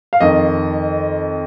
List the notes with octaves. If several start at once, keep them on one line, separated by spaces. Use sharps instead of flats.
F5
F2 D#3 D#5